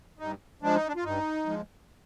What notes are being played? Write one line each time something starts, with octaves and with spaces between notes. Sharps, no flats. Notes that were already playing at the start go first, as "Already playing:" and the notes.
G2 D#4
F3 G#3 D4
D#4
D4
F4
G2 D#4
F3 G#3